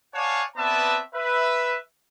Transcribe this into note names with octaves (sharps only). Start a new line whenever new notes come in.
C#5 D5 F5 F#5 G#5 A5
B3 C4 B4 D5 E5 A5
B4 E5